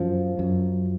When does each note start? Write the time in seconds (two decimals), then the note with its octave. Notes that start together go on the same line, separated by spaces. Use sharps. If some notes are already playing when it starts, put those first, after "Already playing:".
Already playing: F#2 F3
0.39 F#2